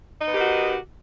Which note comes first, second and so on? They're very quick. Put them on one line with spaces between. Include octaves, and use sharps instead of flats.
D#4 B3 G4 D#3 F#4